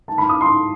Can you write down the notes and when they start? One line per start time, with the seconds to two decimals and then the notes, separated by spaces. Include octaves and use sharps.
0.08 A5
0.18 B5
0.29 D#6
0.41 C6